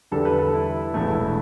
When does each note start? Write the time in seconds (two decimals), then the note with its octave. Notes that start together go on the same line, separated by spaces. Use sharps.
0.11 E2 D3 G3 A4
0.25 B4
0.39 A4
0.53 E4
0.94 E1 E2 E3 A3